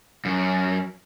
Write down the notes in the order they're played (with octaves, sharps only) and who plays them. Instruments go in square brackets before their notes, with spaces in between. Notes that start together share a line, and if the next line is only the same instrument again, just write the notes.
[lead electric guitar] F#2